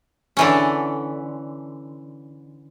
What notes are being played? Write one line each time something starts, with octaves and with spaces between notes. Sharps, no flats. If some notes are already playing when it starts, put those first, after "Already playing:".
D3 E3 C#4